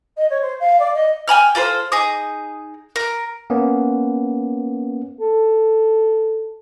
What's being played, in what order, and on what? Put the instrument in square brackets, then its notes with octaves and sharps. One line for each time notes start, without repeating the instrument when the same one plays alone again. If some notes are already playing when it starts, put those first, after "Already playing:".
[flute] D#5
C#5
C5
F5
D5
D#5
[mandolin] G5 G#5 B5 F6
F4 A4 A#4 C5
D#4 G#4 A#5 D#6
A#4
[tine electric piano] A#3 B3 C#4
[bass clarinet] A4